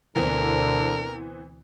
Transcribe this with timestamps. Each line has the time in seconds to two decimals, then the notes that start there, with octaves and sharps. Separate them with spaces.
0.16 D2 B2 D3 E3 B3 C4 A#4